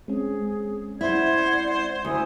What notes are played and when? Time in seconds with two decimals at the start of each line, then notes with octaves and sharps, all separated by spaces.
0.08 G#3 C4 C#4 G#4
1.01 E4 C5 D5 F#5 G#6
2.05 D2 E4 G#5 D#6